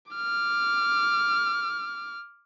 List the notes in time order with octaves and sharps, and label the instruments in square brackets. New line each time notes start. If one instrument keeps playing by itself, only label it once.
[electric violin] D6 F6